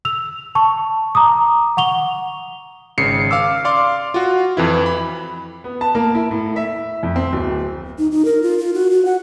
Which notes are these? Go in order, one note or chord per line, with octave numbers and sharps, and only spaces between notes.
E6 F7
A5 C#6
A#5 D6 D#6
F#5 C#6 F7 G7
G#1 C#3 C7 C#7
F5 D6 E6
D5 F5 C6 D6
F4 F#4
F2 E3 E4
B5
B3
A5
A#3
E4
A2
E5
F2
C4
D1
D#4
D#4
A#4
F4
F4
F#4
F#4
F#5